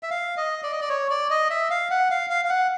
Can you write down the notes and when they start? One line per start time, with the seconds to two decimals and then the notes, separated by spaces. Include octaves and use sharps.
0.03 E5
0.11 F5
0.37 D#5
0.63 D5
0.71 D#5
0.81 D5
0.89 C#5
1.10 D5
1.30 D#5
1.50 E5
1.70 F5
1.91 F#5
2.11 F5
2.30 F5
2.45 F5
2.49 F#5